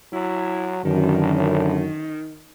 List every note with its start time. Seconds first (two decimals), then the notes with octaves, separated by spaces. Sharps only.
0.13 F#3 E4
0.85 A1 F#2 D3 D#3